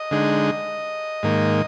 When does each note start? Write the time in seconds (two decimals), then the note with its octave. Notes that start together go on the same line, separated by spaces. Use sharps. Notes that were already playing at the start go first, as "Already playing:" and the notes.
Already playing: D#5
0.11 D3 G#3 D#4
1.23 G#2 D#3 A#3